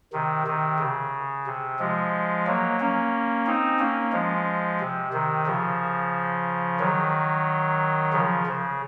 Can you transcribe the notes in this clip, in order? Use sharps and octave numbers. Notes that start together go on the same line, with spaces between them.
C3 D#3
C3 D#3
C#3
C3
F3 G#3
F#3 A#3
A#3 C#4
C4 D#4
A#3 C#4
F3 G#3
C3
C3 D#3
C#3 F3
D#3 F#3
C#3 F3
C#3